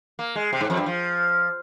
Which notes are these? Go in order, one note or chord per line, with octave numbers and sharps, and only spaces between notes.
A#3
G#3
C3
G#2
F2
G2
F3